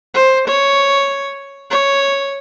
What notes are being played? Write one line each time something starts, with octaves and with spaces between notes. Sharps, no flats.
C5
C#5
C#5